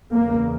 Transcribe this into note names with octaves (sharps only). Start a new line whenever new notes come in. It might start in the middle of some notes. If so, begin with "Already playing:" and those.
E2 C#3 A#3